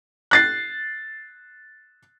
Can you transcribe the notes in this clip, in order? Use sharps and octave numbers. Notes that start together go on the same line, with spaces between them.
F#6 A6 C7